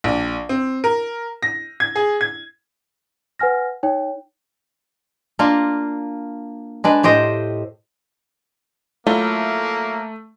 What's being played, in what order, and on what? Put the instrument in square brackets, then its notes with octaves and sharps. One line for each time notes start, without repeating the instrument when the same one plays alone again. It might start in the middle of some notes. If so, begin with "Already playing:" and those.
[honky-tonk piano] A#1
C4
A#4
A#6
G#6
G#4
G#6
[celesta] B4 F#5 G#5 F6 A#6
D#4 C#5 G5
[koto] A#3 D4 F4
G#3 D4 B4
A2 G4 C5 D#5
[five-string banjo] F#3 E4 F4 [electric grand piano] A3 [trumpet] A#3